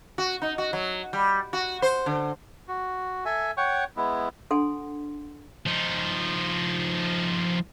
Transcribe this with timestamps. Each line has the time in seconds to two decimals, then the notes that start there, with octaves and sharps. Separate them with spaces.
0.18 F#4
0.42 D#4
0.58 F#4
0.73 F#3
1.13 G3
1.53 F#4
1.82 C5
2.06 D3
2.68 F#4
3.25 A4 E5 G#5
3.57 C#5 F#5 G5 C#6
3.97 G#3 B3 E4
4.51 D4 A4 F#5 G#5 C6
5.66 F3 D#4